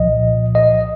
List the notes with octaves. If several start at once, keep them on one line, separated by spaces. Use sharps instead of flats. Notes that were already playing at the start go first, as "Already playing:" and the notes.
Already playing: C2 A#2 F3 D#5
D#5